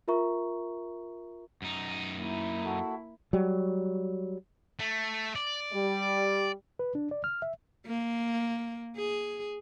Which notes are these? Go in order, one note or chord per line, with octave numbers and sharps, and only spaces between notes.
F4 A#4 E5 A#5 C#6
F#2 D#4
A#3 E4
F#4 A4
F#3 G3
A3
D5
G3
B4
D4
D5
F6
E5
A#3
G#4